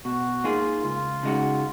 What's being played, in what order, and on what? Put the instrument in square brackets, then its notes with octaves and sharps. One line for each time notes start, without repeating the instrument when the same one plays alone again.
[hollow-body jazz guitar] B2 [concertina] F#4
[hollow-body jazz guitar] A#3 D#4 G#4 [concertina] F4
[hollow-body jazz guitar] C#2 [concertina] F4
[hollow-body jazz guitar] C#3 G#3 D#4 F#4